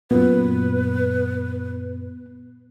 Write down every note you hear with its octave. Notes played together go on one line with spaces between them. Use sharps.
F#2 A#2 B3 B4